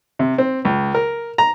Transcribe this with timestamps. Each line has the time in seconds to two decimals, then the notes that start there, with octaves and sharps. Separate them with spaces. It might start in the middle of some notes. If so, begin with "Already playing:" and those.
0.19 C3
0.38 C4
0.65 C#2
0.95 A#4
1.38 A#5